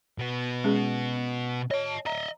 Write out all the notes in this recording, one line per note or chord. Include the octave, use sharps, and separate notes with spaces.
B2 B3
G#3 C#4 G#4
C#5 D#5 A5
D#5 E5 A#5